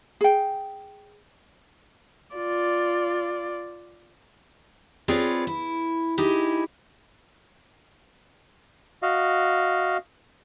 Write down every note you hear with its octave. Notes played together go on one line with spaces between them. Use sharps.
G#4 G5
F4 D5
C4 F4 G#4 B4 C#5 D5
E4
D#4 E4 G4 G#4
F#4 D#5 F5